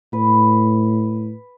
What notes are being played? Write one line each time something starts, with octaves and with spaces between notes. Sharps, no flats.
A2 B4